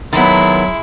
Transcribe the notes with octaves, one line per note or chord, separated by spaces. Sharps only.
D#3 F#3 G#3 B3 E4